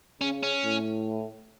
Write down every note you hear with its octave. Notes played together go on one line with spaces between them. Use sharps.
C#3 C#4
C#4
A2